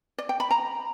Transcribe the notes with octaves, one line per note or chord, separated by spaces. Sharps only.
D5
G5
B5
A#5